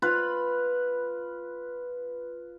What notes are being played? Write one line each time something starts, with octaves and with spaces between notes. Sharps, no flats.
F4 B4